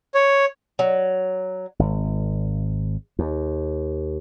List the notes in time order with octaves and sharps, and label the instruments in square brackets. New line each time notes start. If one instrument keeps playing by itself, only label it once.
[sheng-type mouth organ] C#5
[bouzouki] F#3
[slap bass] G#1
D#2